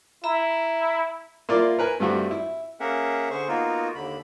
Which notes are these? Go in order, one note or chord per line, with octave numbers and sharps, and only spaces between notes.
E4 E5 A#5 B5
A#3 E4 F4 D5
A#4 B4 G#5
G2 G3 A3 C4 F#4
E4
A#3 C#4 G#4 A#4 E5 F#5
D3 G#4 C5 C#6
A#3 B3 D#4 F4 F#4 A#4
D#2 D3 B5